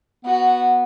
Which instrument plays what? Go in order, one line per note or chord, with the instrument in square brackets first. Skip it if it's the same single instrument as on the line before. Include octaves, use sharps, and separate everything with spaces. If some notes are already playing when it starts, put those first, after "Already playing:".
[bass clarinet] B3 [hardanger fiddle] F#4